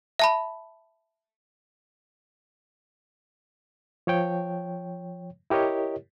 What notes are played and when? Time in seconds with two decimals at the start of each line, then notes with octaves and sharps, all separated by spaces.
0.19 E5 A5 B5
4.07 F3 C#5 G5
5.50 E4 G4 A#4 C#5 D#5